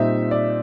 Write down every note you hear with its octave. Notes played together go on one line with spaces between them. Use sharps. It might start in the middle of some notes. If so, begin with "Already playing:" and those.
Already playing: A#2 G3 C4 D#4 E5
D5